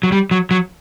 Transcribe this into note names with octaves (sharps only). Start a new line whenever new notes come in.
F#3
G3
F#3
F#3